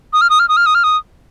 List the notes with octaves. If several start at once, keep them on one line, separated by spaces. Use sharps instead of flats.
D#6
F6
D#6
F6
D#6
F6
D#6
F6
D#6